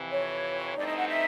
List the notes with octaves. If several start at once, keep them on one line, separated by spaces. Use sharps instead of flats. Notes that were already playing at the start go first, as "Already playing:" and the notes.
Already playing: F2 C3 E3
C#5
G2 E3 A3 C4 D#4 D5
D#5
F#5
E5